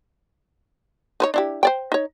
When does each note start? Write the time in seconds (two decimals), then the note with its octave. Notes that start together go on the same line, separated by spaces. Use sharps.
1.20 D#4 B4 C#5
1.34 D4 E4 G4
1.63 C5 D5 G5
1.92 D#4 C#5